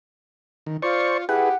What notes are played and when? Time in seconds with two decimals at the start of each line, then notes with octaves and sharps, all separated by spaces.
0.66 D#3
0.82 F4 C5 D5 C#6
1.29 E4 G4 G#4 B4 F#5